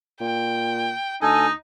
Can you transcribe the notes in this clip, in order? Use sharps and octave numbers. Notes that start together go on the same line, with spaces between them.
A#2 G5
D2 D#4 A4 D#5 G#5